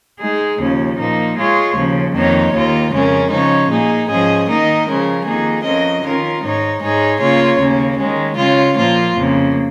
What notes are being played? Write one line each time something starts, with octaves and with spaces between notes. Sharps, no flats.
G#3 D#4 G#4
D#2 C#3 F3 C#4
A#2 F3 A#3 D#4
G#3 F4 G#4 C#5
D#2 C#3 F3
F2 D#3 A#3 D#4 C#5
D#2 D#3 A#3 F4
F2 C#3 G#3 C#4 A#4
C#3 F3 G#3 D#4 C#5
A#2 A#3 D#4 G#4
G#2 F3 C#4 G#4 D#5
D#3 A#3 D#4 A#4 D#5
C#3 F3 G#3 C#4 A#4
F2 D#3 A#3 D#4 G#4
F2 F3 C#4 A#4 D#5
D#3 C#4 F4 A#4
G#2 G#3 D#4 C#5
G#2 G#3 D#4 G#4 C#5
C#3 A#3 F4 C#5
D#2 C#3 A#3 C#4
D#3 G#3 C#4
C#3 G#3 F4 C#5
A#2 F3 A#3 F4
F2 C#3 A#3